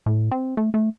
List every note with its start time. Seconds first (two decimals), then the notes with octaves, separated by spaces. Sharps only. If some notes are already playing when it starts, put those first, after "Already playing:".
0.06 A2
0.31 C4
0.57 A3
0.74 A3